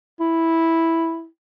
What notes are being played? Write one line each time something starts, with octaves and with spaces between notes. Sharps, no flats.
E4